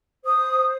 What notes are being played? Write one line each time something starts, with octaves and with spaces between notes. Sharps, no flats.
C5 D#6